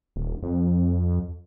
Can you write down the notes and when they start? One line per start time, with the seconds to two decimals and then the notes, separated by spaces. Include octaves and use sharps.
0.16 D#1
0.43 F2